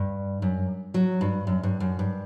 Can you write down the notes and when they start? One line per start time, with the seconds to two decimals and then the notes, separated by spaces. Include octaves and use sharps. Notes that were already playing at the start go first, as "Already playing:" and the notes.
Already playing: G2
0.42 F#2
0.94 F#3
1.21 G2
1.47 F#2
1.63 G2
1.80 F#2
1.99 G2